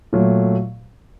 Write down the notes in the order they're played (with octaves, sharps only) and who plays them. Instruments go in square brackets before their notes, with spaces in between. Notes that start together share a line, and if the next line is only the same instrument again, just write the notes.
[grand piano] A#2 F#3 A3